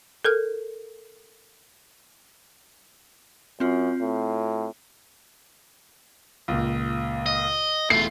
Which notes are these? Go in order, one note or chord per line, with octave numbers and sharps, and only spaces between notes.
A4 A#4 F6
F#2 C4 F4
A2
C#2 A#2
D#5
E1 A3 E4 F4 C7